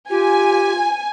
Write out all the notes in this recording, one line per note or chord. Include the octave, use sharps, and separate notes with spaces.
F4 G4 G#5